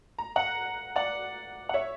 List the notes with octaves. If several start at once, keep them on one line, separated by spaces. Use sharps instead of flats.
A#5
F#5 A#5
D5 F#5
F#5
C#5 E5